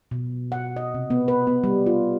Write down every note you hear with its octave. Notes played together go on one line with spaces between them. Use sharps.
B2
F#5
D#5
C3
B3
B4
B3
G3
F4